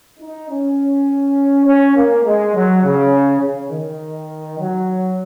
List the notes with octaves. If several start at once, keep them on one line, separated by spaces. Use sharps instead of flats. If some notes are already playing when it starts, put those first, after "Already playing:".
D#4
C#4
C#4
A#3
G#3
F#3
C#3
C#3
D#3
F#3